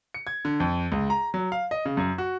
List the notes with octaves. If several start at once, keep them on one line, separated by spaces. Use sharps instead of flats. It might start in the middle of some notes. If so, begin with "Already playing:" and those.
C#7
G#6
D3
F2
C#2
A#5
F#3
F5
D#5
C#3
F#2
F#4